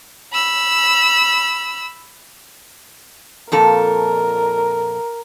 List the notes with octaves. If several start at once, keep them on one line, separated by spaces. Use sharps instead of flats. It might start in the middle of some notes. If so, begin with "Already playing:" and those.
B5 E6
F2 A#2 A4 A#4